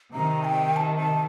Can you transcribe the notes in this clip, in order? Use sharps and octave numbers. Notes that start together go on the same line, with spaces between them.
C3 D#3 A#5
G5
A5
A5